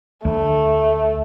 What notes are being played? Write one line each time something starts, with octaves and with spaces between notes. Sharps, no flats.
D2 A3